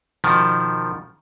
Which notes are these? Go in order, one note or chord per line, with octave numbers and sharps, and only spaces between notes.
B2 D#3 F3